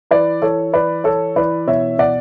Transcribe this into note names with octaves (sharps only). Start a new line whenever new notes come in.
E3 B4 D5
E3 A4 C#5
E3 B4 D5
E3 A4 C#5
E3 B4 D5
B2 C#5 E5
B2 D5 F#5